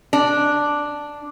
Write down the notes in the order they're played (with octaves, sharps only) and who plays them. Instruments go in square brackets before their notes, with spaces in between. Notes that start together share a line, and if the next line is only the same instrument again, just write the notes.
[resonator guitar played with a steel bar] D4